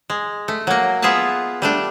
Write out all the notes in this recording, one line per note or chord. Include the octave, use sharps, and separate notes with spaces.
G#3
A3
F#3 A#3
B3 F4 G#4 B4 E5 A5
G3 A3 D4